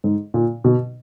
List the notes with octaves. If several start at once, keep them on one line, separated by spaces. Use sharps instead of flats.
G#2
A#2
B2